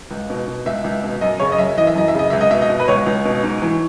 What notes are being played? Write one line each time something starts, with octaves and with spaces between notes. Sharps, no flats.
C#2
B2
B2
C#2 E5
C#2
B2
F#2 D#5
C#3 C#5
D#5
F#2 E5
E3 D#5
E5
F#2 D#5
E5
C#3 D#5
C#2 E5
D#5
B2 E5
D#5
B2
B4
C#2 C#5
C#2
B2
G#2
E3